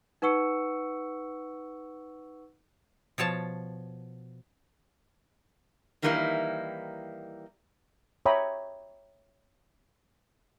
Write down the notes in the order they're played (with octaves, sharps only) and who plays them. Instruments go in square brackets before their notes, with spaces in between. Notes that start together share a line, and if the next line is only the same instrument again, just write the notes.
[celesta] D#4 B4 F#5 C#6 E6 C#7
[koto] B2 F3 C#5 A5
[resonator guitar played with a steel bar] D#3 E3 G3 A#3 D#4 E4
[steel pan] C#5 E5 G5 A#5 B5 D#6